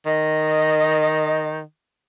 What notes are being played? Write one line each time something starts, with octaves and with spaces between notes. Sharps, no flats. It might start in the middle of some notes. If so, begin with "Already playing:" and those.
D#3 D#5